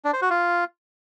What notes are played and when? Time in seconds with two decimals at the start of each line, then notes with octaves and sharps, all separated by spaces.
0.05 D4
0.13 C5
0.22 F#4
0.30 F4